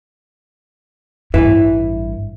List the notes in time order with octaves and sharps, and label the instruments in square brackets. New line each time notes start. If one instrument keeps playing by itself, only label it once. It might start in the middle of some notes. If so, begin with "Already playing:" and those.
[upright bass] A1 G2 [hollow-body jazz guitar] E4 B4 E5